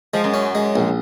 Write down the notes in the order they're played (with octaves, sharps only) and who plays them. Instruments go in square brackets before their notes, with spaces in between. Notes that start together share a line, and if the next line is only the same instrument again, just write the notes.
[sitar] F3 [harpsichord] G#3
[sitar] F#2
[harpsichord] C#4
G#3
A#1